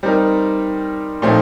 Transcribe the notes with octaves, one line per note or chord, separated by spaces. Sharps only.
G3 C4 D#4 A#4
A#2 F3 A3 C4 D#4